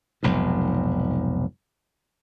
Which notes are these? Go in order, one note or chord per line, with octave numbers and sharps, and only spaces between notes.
F1 B1 F2 G#2